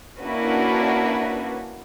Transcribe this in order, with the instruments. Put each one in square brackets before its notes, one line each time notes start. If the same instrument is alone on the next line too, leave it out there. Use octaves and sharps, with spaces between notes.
[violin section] A#3 C#4 D4 E4 F#4 B4